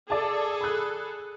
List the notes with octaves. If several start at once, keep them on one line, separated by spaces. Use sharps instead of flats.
G#4 A4 D5 A5
B5 F#6